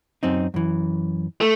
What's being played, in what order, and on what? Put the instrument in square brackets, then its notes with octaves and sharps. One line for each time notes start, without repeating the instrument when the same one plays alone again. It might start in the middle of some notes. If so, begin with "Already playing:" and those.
[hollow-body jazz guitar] F#2 C4 D#4
F#2 E3
[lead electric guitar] A3